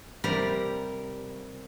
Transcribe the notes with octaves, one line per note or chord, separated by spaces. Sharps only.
C3 G3 G4 A#4 D5 A#5